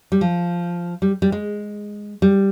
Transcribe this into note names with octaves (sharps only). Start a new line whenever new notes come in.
G3
F3
G3
G3
G#3
G3